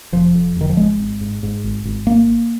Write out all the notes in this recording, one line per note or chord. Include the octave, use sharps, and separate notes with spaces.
F1 F3
F2
F1 D#3
F3
G#1 G#3
G#1
G#2
G#2
G#1
G#1
A#3